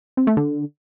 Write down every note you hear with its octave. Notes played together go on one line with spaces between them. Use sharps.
C4
A3
D3